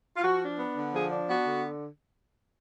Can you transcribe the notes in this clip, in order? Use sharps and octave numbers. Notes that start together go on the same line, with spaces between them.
F4
F3 F#4
D4
B3
D3
F3 G#4
D4
B3 F#4
D3